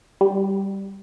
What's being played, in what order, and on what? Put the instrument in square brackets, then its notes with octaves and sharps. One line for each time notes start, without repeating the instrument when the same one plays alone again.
[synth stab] G3